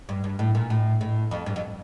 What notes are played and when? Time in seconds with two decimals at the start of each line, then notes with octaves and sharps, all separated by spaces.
0.09 G2
0.24 G2
0.39 A2
0.55 A#2
0.70 A2
1.01 A2
1.31 F2
1.46 G2
1.56 F2